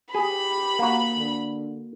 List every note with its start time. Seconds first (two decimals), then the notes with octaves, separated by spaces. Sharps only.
0.15 G4 G#4 B5
0.79 A#3 F#4
1.15 D3